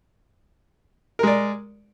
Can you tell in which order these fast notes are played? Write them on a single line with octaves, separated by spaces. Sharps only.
A#4 G#3 D5